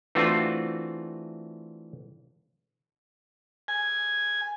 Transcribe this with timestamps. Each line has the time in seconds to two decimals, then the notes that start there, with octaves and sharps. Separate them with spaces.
0.15 E3 A3 C4 D4 F4 F#4
3.68 G#5